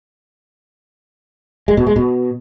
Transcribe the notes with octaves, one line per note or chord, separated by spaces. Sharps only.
G#3
B2
G#3
B2